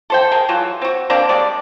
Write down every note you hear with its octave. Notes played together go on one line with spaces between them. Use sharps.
A4 C5 G5
G#4 A#4
E3 F#3 F4
C4 F#4
A#3 C4 D4 D5
G3 G#3 D5